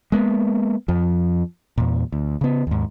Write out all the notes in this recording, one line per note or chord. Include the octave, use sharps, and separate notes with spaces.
G#3 A#3 B3
F2 F3
E2 A#2
D2
C#3 B3
D#2 G#2